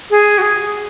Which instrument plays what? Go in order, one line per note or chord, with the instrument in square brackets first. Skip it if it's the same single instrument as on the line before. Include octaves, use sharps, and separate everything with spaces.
[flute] G#4
F#4
G#4